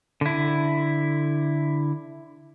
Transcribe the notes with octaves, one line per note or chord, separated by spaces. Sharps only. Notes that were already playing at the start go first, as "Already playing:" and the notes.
D3 E4